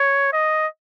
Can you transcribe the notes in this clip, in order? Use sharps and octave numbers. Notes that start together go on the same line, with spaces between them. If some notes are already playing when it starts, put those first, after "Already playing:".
Already playing: C#5
D#5